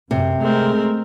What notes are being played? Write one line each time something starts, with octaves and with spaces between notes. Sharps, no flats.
F#2 C3
G#3 A3 C4 A#4